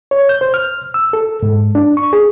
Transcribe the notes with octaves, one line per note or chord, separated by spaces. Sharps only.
C#5
G6
C5
F6
E6
A4
G#2
D4
C#6
G#4